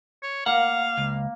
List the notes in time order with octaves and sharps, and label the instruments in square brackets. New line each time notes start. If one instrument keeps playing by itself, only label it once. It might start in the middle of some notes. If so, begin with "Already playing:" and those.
[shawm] C#5
[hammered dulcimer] A#3 [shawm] F5 [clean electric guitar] F#5
[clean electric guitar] C#2